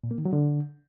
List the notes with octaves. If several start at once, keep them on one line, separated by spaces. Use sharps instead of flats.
A#2
A#3
D#3
F#3
D3